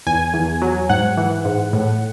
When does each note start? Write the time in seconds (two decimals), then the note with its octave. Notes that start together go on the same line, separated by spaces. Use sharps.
0.06 E2 G#5
0.34 E2
0.62 F#3
0.90 G#2 F#5
1.17 E3
1.45 G#2
1.73 A2